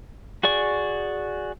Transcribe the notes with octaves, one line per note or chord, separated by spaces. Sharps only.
F#4 G#4 D5 C#6